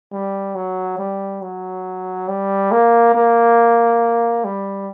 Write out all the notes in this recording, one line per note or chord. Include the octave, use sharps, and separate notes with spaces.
G3
F#3
G3
F#3
G3
A#3
A#3
G3